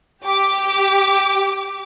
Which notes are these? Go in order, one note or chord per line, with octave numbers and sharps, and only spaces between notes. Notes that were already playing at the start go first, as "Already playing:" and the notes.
G4 D6